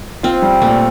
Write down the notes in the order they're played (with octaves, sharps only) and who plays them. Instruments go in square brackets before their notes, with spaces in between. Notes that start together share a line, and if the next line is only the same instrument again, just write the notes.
[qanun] C4 [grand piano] F4
[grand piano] G3
[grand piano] A#2 [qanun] A3